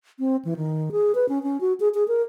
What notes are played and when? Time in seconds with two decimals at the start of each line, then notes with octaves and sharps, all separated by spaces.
0.19 C4
0.45 E3
0.56 D#3
0.92 G#4
1.15 B4
1.29 C#4
1.43 C#4
1.61 F#4
1.80 G#4
1.94 G#4
2.08 A#4